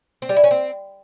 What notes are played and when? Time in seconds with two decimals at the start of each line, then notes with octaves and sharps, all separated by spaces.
0.22 C4
0.29 G3
0.36 E4
0.44 C#4
0.51 C4